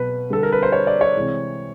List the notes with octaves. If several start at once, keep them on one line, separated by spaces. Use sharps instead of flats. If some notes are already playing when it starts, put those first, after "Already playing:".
Already playing: B2 F#3 B4
D3 G3 A4
A#4
B4
C5
C#5
D5
C#5
C3 E3 G#3